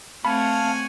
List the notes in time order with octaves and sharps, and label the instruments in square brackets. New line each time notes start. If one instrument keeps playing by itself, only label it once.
[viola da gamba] A3 C4 [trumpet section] C#5 F#5 G#5 [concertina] F5 A5 [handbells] B5